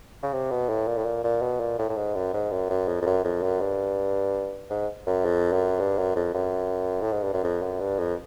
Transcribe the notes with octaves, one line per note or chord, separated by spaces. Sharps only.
C#3
C3
B2
A2
A#2
A2
A#2
A#2
B2
A#2
A2
A2
G#2
F#2
G#2
F#2
F#2
F2
F2
F#2
F2
F#2
G2
G#2
F#2
F2
F#2
G2
F#2
F2
F#2
A2
G#2
G2
F#2
F2
F#2
G2
F2